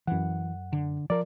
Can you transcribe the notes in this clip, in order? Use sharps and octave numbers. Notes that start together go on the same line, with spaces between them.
F#2 E3 F#5
D3
F3 A#4 D5